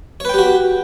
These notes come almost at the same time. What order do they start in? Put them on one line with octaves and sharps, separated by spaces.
C#5 B4 G5 G4 F#4